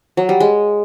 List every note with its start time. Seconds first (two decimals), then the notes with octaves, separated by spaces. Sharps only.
0.17 F#3
0.29 G3
0.40 G#3